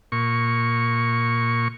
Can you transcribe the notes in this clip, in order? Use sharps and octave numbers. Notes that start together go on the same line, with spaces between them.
A#2 C#6